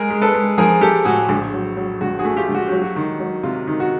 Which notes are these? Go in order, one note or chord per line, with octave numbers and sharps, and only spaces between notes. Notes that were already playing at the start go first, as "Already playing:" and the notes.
Already playing: G#3 G#4 A#4
G#3
A4 B4
G#3
F3 G#4 A#4
F3 G4 A4
A2 F#4 G#4
A#1
F#3
F#3
A#1 F#4
F#4 G#4
A3
F4 G4
A#1
F#4
F#3 G4
F#4
D#3
F#3
C3 F4
D#3
F#4